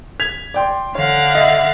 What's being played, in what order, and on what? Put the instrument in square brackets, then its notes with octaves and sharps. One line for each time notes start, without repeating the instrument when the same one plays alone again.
[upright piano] G#6 B6 F7
D5 G5 C6
[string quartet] D3 F5 F#5 [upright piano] C#5
[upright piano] D#5 E5